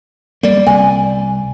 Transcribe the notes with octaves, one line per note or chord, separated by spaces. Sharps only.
G3 A#3 D5
C2 G#5